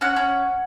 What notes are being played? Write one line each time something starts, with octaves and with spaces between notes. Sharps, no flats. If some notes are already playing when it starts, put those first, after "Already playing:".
C#4 F#5
C#4